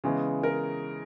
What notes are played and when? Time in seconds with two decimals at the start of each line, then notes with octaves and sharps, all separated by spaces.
0.04 C#3 E3 G#3 B3
0.43 A#4